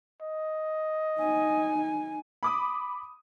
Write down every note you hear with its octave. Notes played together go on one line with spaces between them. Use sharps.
D#5
D#4 G#5
B5 D6 D#6